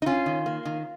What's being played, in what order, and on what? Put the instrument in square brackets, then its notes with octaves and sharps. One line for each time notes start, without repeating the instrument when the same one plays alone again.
[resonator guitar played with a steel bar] D#4
C#4 F4
D#3
A#3
D#3